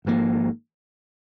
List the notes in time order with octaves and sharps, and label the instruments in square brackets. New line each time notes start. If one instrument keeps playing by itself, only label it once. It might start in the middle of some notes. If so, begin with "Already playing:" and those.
[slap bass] G#1 G#2 F3 A#3